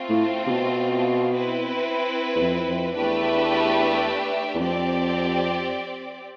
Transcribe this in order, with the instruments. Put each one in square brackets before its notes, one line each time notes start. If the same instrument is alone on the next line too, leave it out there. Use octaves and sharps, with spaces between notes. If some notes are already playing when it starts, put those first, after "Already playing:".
Already playing: [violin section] A3 C4 F4
[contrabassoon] A2
C3
B2
[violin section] C4 E4 B4
[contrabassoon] E2
F2
F2
[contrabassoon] E2 [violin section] A3 D4 G4 B4 E5
[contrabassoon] E2
[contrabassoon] F2 [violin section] C4 G4 D5